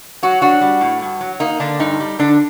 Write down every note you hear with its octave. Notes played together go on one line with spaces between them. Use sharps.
F#3 F#4
D4 F#4
G3
A2
G2
F#3
A#3 D#4
D3 D4
G2 D#4
G3
D3 D4